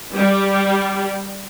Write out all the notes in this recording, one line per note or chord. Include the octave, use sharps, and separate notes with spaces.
G3